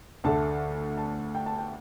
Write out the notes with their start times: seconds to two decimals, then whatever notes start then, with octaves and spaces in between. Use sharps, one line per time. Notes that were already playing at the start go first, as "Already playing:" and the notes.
0.24 D2 D3 A3 A5
0.97 A5
1.35 G5
1.46 A5
1.58 G5